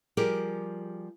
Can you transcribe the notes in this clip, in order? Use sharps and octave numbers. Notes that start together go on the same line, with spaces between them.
F3 G3 G4 G#4 A#4